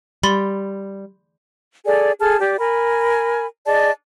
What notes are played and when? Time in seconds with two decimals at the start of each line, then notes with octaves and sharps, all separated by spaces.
0.23 G3 B5 C6 A6
1.86 G#4 A4 D5 G#5
2.20 G#4 A4 A5 F6
2.40 G4 D5
2.59 A#4 G#5 B5
3.66 G#4 D5 D#5 A5